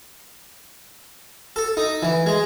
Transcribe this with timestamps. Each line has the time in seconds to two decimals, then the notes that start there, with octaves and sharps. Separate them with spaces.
1.56 A4
1.77 D#4
2.02 E3
2.26 G#3